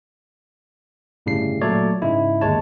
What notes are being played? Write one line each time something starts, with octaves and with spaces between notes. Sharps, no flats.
G1 A2 C#3 G3 C7
A#2 F#3 A3 A4 C#5 D5
G#2 C#3 G#3 E4
G1 D#2 G#3 C#5 A5